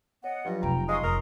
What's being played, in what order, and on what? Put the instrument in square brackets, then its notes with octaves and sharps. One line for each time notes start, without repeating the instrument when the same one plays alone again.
[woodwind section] B3 D#5 F#5 [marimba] C#5
[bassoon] G2 [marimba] F3 F#3 F4
[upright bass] F1 C3 [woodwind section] G5 A#5
[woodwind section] F#3 C6 D#6 [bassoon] G#3 [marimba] F5 C#6
[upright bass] F1 [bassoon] A#4